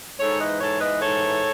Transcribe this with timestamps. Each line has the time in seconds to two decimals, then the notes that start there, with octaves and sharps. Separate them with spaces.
0.19 G#2 A4 C#5
0.40 E3 B4 D#5
0.61 G#2 A4 C#5
0.81 E3 B4 D#5
1.01 G#2 A4 C#5
1.22 E3